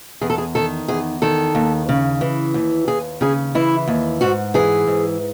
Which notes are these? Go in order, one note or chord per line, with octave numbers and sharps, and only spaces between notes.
E2 G#4
A4
G#4
D#3 A4
E2 G#4
D#3 A4
D#2
C#3
E3
D#2
D#2 G#4
C#3 G#4
E3 E4
D#2
G#2 F#4
E3 G#4
G#2